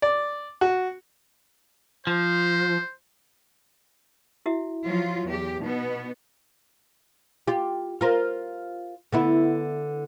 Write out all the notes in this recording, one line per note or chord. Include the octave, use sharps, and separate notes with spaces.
D5
F#4
F3 C5
E4 F#4 E5
F3 F#3 F4
E2 G4
B2 B3 D#4
F4 G4
F4 A#4 C5
D3 B3 E4